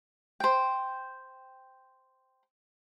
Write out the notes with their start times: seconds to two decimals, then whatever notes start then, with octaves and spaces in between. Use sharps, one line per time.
0.40 C5 G5